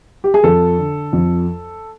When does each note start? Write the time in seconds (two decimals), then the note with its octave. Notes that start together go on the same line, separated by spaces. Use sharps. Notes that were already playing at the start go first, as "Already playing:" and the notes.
0.24 G4
0.34 G#4
0.44 F2 A4
0.78 D3
1.13 F2